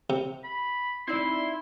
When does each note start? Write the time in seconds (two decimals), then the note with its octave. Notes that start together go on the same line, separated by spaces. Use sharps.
0.10 C3
0.44 B5
1.07 C4 D#4 E4 D5 C6